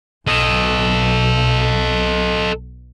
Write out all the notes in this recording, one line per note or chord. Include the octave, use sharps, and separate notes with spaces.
B1 A4 D#5